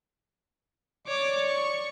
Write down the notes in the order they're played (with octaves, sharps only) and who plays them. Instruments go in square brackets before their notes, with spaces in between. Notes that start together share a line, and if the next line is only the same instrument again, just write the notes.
[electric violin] C#5 D6 [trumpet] D5
[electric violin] C#6